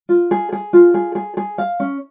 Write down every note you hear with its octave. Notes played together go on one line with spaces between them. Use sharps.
F4
G#4
G#4
F4
G#4
G#4
G#4
F5
C#4